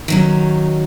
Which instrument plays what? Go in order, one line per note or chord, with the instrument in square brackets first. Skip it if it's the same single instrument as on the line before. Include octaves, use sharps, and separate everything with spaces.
[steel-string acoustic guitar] D#3 F#3 C#4